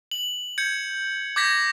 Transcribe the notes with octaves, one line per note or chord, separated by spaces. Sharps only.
F#7
G6 G#6 C#7
D6 G6 G#6 A#6 B6